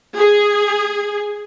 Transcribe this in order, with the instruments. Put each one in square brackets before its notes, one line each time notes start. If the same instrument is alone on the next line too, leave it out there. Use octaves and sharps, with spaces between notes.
[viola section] G#4